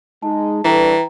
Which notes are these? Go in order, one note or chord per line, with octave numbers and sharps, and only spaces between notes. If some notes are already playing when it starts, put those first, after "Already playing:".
G#3 D#4 A5
E3 G3 D4 A4 B4 G5 A#5